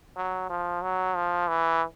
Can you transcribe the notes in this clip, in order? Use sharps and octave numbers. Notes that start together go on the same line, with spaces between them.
F#3
F3
F#3
F3
E3